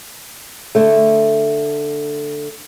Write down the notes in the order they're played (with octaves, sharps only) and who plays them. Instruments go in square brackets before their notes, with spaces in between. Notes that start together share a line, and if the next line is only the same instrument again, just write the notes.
[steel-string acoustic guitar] D3 A3